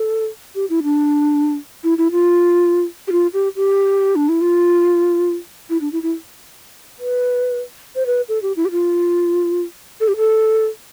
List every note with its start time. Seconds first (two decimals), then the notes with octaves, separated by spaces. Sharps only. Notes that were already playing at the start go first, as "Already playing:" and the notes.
Already playing: A4
0.55 G4
0.70 E4
0.83 D4
1.84 E4
1.98 E4
2.12 F4
3.08 G4
3.12 F4
3.33 G4
3.56 G4
4.16 D4
4.29 E4
4.41 F4
5.70 E4
5.81 D4
5.92 E4
6.03 E4
6.99 B4
7.96 C5
8.06 B4
8.29 A4
8.42 G4
8.57 E4
8.65 G4
8.71 F4
10.00 A4
10.08 G4
10.17 A4